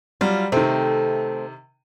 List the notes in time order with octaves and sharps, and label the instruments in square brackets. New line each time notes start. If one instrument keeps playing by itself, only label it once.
[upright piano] F#3 G3 [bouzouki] F4
[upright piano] C3 D#3 [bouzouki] A3 C4